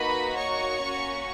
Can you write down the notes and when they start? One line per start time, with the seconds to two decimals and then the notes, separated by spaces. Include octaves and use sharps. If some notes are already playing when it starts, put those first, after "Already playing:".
Already playing: A#3 D#4 F#4 B4 B5
0.36 C#5 C#6
0.81 A#3 C#4 F#4